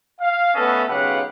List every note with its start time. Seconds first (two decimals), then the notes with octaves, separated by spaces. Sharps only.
0.21 F5
0.55 A3 B3 C#4 A4 B4 D#5
0.89 B1 C#3 G4 B4 F5 F#5